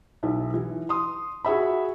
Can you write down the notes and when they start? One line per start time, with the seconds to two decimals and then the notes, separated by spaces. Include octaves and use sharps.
0.23 B1 E4
0.54 E3
0.89 C6 D#6
1.45 F#4 G#4 E5 B5